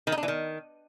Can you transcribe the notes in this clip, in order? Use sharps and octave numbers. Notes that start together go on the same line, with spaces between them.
D#3
D#4
D4
E3
D#3